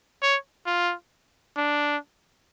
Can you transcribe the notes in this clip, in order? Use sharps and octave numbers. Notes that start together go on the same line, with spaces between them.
C#5
F4
D4